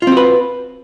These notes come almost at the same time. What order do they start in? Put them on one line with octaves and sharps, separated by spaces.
F4 C4 F#4 B4